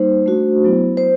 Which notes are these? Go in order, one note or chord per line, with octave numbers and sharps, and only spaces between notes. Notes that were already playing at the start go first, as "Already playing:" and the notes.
Already playing: G3 A#3 D#4 C5
A3 D4 F#4
F#3 B3 E4
C5